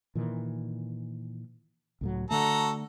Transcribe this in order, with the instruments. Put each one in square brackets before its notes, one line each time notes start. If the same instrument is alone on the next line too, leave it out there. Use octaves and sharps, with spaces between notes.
[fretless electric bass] A#2 D#3 E3
C#2 A2 F#3
[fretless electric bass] D3 A3 [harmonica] F#4 A4 A#5